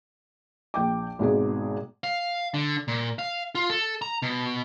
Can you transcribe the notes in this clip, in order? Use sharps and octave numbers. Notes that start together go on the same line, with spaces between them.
A#1 G5 D6
G#1 G#2 B2 G#4
F5
D3
A#2
F5
F4
A4
A#5
B2